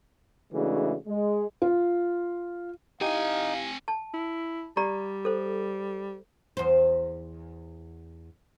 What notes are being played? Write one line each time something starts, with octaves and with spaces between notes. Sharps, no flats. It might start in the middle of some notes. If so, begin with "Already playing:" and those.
C#3 E3 G#3 A3 D4 F#4
G#3
F4
C4 D#4 E4 G4 F5 G#5
A5
E4
G3 G4 D5 A#5
A4 C5
E2 C5